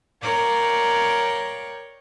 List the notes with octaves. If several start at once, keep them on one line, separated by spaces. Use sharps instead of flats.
A#4 C#5 D5 F5 G5